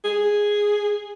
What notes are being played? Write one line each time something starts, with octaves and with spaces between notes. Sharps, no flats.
G#4